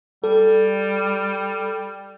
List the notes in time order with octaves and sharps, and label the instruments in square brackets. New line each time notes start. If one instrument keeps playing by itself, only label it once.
[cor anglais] G3 [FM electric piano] A4